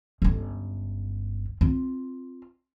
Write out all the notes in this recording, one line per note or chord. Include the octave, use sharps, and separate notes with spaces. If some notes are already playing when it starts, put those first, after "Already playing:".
G1 C#2
C4 F4